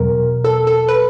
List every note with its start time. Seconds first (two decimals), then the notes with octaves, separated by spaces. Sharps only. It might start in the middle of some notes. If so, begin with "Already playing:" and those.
Already playing: E2 B2 F#3 A#4
0.44 A4
0.67 A4
0.88 B4